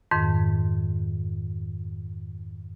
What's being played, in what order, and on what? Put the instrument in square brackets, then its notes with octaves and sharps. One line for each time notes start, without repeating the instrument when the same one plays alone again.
[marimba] F2 G#2 D#3